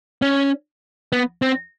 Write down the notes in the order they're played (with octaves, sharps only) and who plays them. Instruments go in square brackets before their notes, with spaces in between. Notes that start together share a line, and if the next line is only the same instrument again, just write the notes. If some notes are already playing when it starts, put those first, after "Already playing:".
[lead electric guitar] C#4
B3
C4